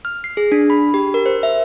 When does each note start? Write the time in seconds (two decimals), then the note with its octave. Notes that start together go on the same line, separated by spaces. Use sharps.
0.05 F6
0.24 C7
0.37 G#4
0.52 D4
0.70 B5
0.94 G4
1.14 A#4
1.26 C5
1.43 E5